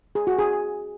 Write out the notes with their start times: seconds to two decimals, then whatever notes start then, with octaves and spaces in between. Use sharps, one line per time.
0.15 G#4
0.27 F#4
0.39 G#4